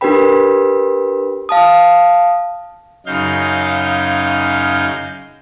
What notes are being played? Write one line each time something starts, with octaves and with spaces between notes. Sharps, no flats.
D4 G4 A#4 B4 G5 B5
F5 A5 D#6
F#2 C#3 D#4 F5 G6